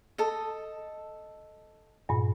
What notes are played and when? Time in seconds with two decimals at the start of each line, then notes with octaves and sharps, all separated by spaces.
0.18 A4 D#5
2.09 G2 A#2